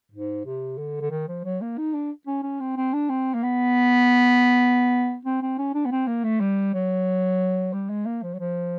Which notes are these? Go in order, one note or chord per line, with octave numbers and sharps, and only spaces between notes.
G#2
C3
D3
D3
D#3
F3
F#3
A#3
D#4
D4
C#4
C#4
C4
C4
D4
C4
A#3
B3
C4
C4
C#4
D4
B3
C4
A#3
A3
G3
F#3
G3
G#3
A#3
F3
F#3
F3